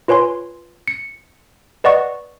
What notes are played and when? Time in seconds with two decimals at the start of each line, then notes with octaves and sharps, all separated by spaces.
0.08 F4 B4 C#5 G#5 C6
0.88 C#7
1.84 B4 D5 D#5 F#5 C#6